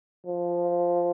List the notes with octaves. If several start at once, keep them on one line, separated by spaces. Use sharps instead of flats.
F3